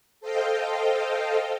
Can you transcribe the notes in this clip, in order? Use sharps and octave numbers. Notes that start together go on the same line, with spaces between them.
A4 C5 D#5 F5 G5